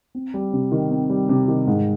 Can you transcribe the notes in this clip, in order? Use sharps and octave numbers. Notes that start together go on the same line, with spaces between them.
C4
G3
C3
D#3
C4
G3
C3
D#3
G#2